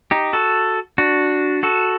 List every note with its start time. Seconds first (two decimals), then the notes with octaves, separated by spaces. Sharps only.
0.11 D#4 G4
0.33 F#4 A4
0.98 D4 F#4
1.63 F#4 A4